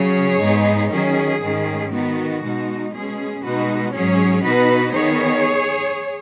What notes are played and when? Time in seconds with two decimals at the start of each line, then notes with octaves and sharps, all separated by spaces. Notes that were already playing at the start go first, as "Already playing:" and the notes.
Already playing: C#3 F#3 C#4 G#4 C#5
0.41 G#2 G#3 B3 D#4
0.91 D#3 F#3 C#4 G#4
1.41 G#2 D#3 G#3 C#4
1.92 D#3 B3 D#4 F#4
2.42 B2 G#3 D#4
2.93 B2 G#3 C#4 G#4
3.43 B2 G#3 D#4 F#4 B4
3.94 G#2 F#3 C#4 G#4 C#5
4.44 B2 B3 D#4 F#4 B4
4.94 D#3 B3 D#4 G#4 C#5